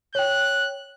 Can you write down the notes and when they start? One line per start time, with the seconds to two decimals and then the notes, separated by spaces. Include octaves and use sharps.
0.15 C#5 G5 F#6